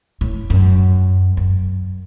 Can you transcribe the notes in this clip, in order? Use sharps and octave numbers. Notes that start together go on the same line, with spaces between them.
A2
F#2
F#2